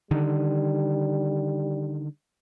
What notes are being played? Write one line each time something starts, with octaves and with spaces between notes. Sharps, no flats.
D3 D#3 G3